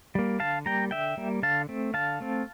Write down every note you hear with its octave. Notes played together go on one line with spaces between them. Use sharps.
G3 A#3
D3 F5 A5
G3 A#3 G5 A#5
D3 E5 G5
G3 A#3
D3 F5 A5
A3 C4
D3 F5 A5
A3 C4